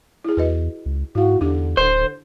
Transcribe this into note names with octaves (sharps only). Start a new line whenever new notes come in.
E4 G#4
E2 F#4 B4 D#5
C#2
G#2 E4 F#4 F5
E2 D3 D4 D#4 G4
D1 C5